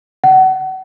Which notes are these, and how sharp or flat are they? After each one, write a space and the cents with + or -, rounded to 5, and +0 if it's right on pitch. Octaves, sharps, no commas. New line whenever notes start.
F#5 +30